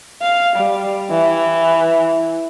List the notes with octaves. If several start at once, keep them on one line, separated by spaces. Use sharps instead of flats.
F5
G3
E3